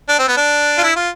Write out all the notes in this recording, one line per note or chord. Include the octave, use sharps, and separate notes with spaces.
D4
C4
B3
D4
F4
E4
F4